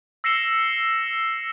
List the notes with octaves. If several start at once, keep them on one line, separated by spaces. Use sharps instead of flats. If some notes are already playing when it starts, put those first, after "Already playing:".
E6 A#6 C7 C#7 E7 G7